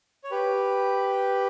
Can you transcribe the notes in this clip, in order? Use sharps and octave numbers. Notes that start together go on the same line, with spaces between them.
C#5
G4 B4